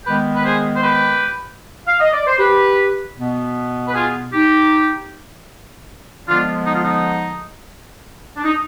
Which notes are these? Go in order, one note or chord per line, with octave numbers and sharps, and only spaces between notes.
D#3 G#3 B3 G4 B4
B4
G#4 C5
C5
G4 B4
F5
D#5
D5
C5
G4 B4
B2 B3
B4
F4 G#4
D#4 G4
D3 F3 G#3 B3 D4 F4
D#4
F4
D#4
D4
D#4